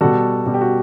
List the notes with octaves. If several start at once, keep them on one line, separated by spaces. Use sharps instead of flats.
B2 G3 F#4 A4
B2 G3
G4
F#4